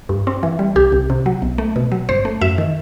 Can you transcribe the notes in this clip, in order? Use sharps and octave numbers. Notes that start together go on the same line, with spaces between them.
G2
C4
E3
G3
C2 G4
C2
C3
F#3
B1
A3
B2
F#3
G1 C5
A3
F#2 E5
D#3